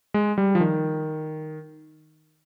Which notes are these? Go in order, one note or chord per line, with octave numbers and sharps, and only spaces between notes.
G#3
G3
F3
D#3